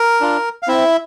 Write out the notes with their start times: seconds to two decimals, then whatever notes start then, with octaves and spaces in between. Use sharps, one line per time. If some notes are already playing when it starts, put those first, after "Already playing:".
Already playing: A#4
0.21 D4 F4
0.63 F5
0.68 C4 E4 E5